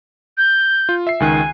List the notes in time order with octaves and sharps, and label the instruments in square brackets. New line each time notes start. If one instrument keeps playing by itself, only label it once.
[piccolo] G6
[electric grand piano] F4
E5 C7
[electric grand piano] C#2 D#3 F#6 [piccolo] G#5